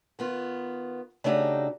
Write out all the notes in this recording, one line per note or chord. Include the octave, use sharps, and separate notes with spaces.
D#3 B3 F4
C#3 A3 D4 D#4 F#4 G4